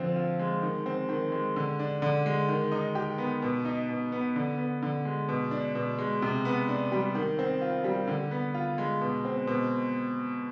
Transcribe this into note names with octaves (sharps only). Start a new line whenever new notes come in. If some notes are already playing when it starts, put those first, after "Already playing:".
Already playing: D3 F3 C4
F4
G#3
D#3
C4
D#3
G#3
D3
D4
D3
G#3
D#3
D#4
G4
B3
B2
D#4
B2
B3
D3
B3
D3
G#3
B2
D4
B2
G#3
C3
B3
D4
G3
D#3
C4
F4
G3
D3
B3
F4
G#3
B2
C4
B2